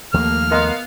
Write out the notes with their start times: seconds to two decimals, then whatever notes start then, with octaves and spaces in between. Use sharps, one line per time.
0.14 D#2 F3 A3 A#3 F6
0.51 B3 A#4 D#5 F5 C6